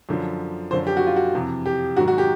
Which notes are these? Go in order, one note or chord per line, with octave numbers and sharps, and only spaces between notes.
F#2 D3 F3
F#2 D3 F3 C5
G4
F#4
F4
F#4
F2 C3 E3
G4
G#2 D#3 F#3 F#4
F#4
G4